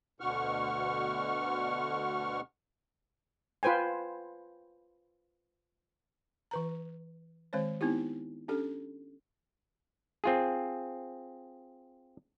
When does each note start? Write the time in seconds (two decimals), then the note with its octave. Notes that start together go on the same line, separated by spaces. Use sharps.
0.20 D2 B2 D3 F#5 C#6 F6
3.63 F4 B4 C5 G5 G#5
6.51 E3 B4 A#5
7.53 D#3 G#3 C4 C5 C#5
7.81 B3 C4 D#4 E4 G4
8.48 C#4 D4 G4 A4
10.24 C4 F4 G#4